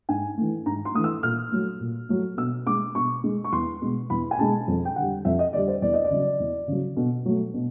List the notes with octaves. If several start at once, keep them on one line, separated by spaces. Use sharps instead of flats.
G#2 G#5
E3 A3
G#2 A#5
C6
E3 A3 D#6
E6
A#2 F6
F#3 A3
A#2
F#3 A3
B2 E6
G#3 D6
B2 C#6
G#3
C#6
E2 C6
B2 G#3
E2 B5
G#5
B2 G#3 A5
F2
G5
D3 G3 F#5
F2 E5
D#5
D3 G3 D5
C5
E2 D5
D#5
D5
C#3 F#3
E2
C#3 F#3
B2
F#3 A3
B2